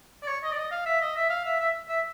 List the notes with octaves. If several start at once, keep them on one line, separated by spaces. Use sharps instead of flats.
D5
C#5
D#5
D5
D#5
F5
E5
D#5
E5
F5
E5
E5
E5